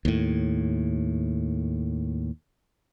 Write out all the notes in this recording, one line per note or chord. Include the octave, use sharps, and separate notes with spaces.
D#2 A2